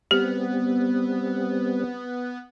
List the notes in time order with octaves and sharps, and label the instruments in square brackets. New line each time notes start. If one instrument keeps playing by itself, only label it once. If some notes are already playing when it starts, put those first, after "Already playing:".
[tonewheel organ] G3 C4 [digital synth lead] B3 [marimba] G4